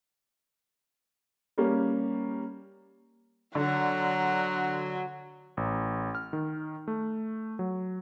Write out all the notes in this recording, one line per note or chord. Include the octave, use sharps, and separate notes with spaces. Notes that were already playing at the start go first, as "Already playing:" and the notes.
G3 A#3 C#4 G4
D3 F#3 F#5 A#5
A1
F6
D#3
A3
F#3